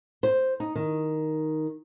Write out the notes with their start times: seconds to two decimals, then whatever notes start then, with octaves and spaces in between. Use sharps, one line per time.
0.23 C5
0.60 D#4
0.75 D#3